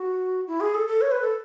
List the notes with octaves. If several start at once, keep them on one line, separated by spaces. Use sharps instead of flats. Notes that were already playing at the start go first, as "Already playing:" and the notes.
Already playing: F#4
E4
G#4
A4
A4
C#5
B4
A4